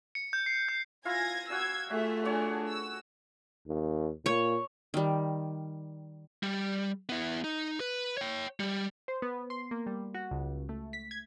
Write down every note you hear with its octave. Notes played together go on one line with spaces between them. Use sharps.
C#7
G6
C7
G6
E4 F4 F5 G#5 G#6 A#6
F#4 F5 G#5 E6 G#6
A3 F4 F#4 G#4 E5
D4 F#4 G#4 C#5
E6
D#2
A#2 C#5
D#3 G3
G3
B3 E4
D#4
B4
C#5 G5
G3
C5
B3
C6
A#3
G3
F#4
C#2
A3
B6
G#6